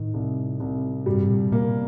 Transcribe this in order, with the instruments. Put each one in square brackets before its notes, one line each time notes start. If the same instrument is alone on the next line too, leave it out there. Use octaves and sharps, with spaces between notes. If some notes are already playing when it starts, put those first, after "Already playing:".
Already playing: [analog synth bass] A2 [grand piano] D#3
[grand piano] C2
C2
[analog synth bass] G2 [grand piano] G3
[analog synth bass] A#2
[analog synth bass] A#2 [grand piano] A#3